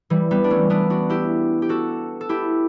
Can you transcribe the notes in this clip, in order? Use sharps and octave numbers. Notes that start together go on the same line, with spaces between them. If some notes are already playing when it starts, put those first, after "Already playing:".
E3 G3
G3 B3
D4
A3 C#4
B3 D4
D4 F#4
E4 G4
G4
F#4 A4
A4
E4 G4